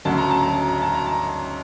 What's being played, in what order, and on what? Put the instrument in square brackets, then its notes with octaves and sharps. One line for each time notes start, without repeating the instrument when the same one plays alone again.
[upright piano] D2 C#3 F#3 A5
A#5
A5
A#5
A5
A#5
A5
A#5
A5